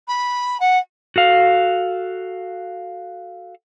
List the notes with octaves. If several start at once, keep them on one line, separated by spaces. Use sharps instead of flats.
B5
F#5
F#4 A4 F5